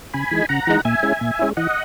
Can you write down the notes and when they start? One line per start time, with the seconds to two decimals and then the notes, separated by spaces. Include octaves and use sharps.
0.14 C#3 G#5 B5
0.31 E3 G#3 D#4
0.49 C#3 F#5 A#5
0.67 E3 G#3 D#4
0.85 A#2 E5 G#5
1.03 G#3 C#4 E4
1.21 A#2
1.39 G#3 C#4 E4
1.57 E3 D#5 F#5